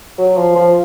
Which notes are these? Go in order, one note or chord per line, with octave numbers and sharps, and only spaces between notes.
F#3
F3
F3